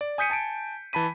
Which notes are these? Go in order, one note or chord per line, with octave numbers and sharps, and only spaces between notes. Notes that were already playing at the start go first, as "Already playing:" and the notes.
D5
G#5 D#6 G6 B6 C#7 D#7
G#5 A5 C#7 D7
E3 A5 B5 B6 D#7